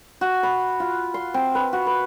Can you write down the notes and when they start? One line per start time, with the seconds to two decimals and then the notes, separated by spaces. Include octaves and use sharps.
0.21 F#4
0.43 B5
0.80 F4
1.14 C6
1.34 C4
1.55 B4
1.73 F#4
1.87 B4